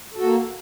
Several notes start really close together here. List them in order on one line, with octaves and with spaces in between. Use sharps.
A4 F#4 A#3